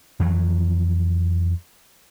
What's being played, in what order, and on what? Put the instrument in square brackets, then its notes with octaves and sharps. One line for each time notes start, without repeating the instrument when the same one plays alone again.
[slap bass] F2 E3 F#3